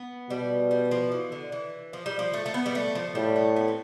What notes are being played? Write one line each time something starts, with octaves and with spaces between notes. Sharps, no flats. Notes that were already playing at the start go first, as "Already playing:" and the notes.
Already playing: B3
B2 G3
G3
F3
E3
D3
E3
F3
G3
F3
A3
A3
B3
G3
A3
F3
A2 G3
A3
B3
C4